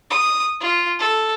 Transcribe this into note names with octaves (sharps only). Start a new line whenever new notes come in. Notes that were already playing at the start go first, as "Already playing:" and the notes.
D#6
F4
A4